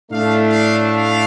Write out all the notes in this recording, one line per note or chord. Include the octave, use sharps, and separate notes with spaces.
A2 A3 D4 F5
F5
F5